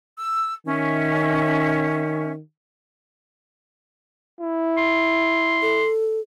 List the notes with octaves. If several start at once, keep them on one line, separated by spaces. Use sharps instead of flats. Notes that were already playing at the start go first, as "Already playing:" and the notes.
E6
D#3 C#4 E5
E4
C6
A4